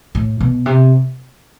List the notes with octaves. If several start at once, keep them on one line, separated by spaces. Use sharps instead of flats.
A2
B2
C3